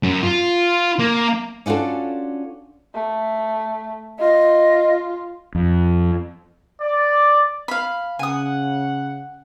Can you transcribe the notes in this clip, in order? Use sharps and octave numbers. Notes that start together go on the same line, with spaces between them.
F#2
F4
A#3
C#4 D4 F4 F#4 A4
A3
F4 D#5
F2
D5
F5 B5
C#3 F#5 G#5 D#6